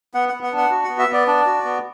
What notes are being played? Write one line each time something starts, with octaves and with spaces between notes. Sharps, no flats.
B3 F#5
B3 F#5
F#5
D4
F#5
F#4
B3 F#5
E5
B3 D5
D4 D5
F#4
B3